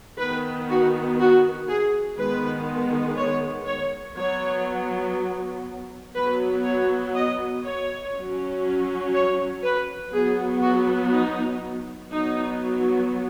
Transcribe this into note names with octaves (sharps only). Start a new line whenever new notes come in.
D#3 B3 B4
F#4
F#4
G#4
D#3 G#3 B3 B4
C#5
C#5
F#3 B3 C#5
F#3 B3 B4
C#5
D#5
C#5
F#3 C#4
C#5
B4
F#3 B3 G#4
F#4
D#4
F#3 B3 D#4